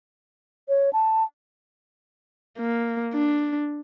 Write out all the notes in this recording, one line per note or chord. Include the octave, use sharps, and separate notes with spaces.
C#5
A5
A#3
D4